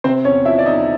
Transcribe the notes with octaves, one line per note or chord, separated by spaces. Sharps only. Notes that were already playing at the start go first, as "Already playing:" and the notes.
C3 C4 C5
E2 C#4 C#5
F3 E4 E5
D5
E2 D#4 D#5